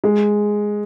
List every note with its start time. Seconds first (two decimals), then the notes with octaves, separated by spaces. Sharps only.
0.04 G#3